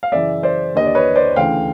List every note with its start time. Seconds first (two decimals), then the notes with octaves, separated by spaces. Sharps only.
0.03 F5
0.12 F#2 C#3 E3 D5 E5
0.43 C5 D5
0.74 D#2 D3 D#5
0.86 D5
0.95 B4 C#5
1.16 C5 D5
1.36 D2 C#3 E3 F5 G5